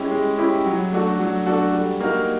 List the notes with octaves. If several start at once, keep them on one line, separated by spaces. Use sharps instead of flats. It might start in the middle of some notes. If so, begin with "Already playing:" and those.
Already playing: G#3 C#4 E4 G4
G#3
C#4 E4 G4
F#3
A3 D4 F#4 A4
F#3
A3 D4 F#4 A4
G3
A#3 D#4 F#4 A#4